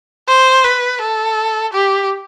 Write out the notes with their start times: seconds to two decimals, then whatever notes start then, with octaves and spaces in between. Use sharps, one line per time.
0.28 C5
0.64 B4
1.01 A4
1.73 G4